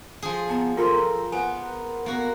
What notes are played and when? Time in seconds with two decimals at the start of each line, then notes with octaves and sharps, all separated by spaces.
0.22 F3 G#4
0.49 B3 A5 A#5
0.77 F4 A4 A#4 C5 C6
1.32 B3 B4 F#5 G#5
2.06 A#3 B3 F#4